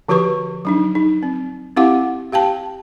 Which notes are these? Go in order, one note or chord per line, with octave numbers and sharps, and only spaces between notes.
D3 F3 F#4 G4 B4 C#6
F#3 D4 D#4
D#4
C4
C4 E4 G4 F5 F#5 D6
G4 F5 G5 A5